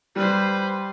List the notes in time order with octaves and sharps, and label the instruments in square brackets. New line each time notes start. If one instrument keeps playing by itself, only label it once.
[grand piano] G3 [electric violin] B4 C5